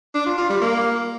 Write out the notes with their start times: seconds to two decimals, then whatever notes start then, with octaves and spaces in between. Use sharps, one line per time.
0.14 D4
0.26 F4
0.38 F4
0.49 G3
0.61 A#3